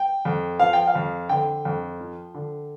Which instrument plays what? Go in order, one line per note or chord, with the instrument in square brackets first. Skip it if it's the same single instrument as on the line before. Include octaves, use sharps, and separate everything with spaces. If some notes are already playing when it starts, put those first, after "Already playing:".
Already playing: [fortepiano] G5
F2
F3 F5
G5
F5
F2
D3 G5
F2
F3
D3